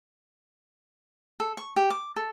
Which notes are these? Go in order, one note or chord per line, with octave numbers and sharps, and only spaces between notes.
A4
C#6
G4
D6
A4